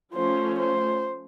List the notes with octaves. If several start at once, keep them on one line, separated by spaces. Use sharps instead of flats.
F3 A3 C#4 C5
C5